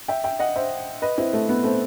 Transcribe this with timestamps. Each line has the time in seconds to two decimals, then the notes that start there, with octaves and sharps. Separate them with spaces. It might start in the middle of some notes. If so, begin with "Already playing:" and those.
0.08 E5 G5
0.24 E5 G5
0.39 D#5 F#5
0.56 C5 E5
1.02 B4 D#5
1.18 C4 E4
1.33 A3
1.49 B3
1.64 A3 C4